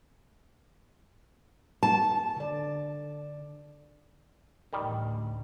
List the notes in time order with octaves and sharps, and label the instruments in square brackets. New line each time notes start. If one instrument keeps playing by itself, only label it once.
[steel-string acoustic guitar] A5
[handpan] D3 D5
[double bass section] A1 D2 [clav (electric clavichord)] D#3 G3